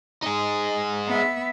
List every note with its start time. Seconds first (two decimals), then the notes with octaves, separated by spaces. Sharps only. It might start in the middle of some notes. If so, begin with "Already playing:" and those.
0.23 D#4 G#4
1.07 B3 E5